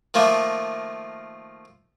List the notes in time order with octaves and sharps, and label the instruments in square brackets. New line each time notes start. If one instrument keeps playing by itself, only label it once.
[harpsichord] D#3 F3 A3 A#3